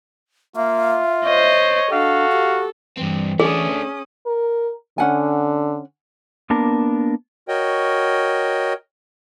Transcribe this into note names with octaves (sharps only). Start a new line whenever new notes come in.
A#3 F4 E5
C5 C#5 D#5
D4 F#4 A4 F5
G4
G2 E3 C4
A3 C#4 D4 G#4 D#6
A#4
D3 C#4 F#5 G#5
A#3 B3 D4 A#4 A5
F#4 A#4 C#5 D#5 G5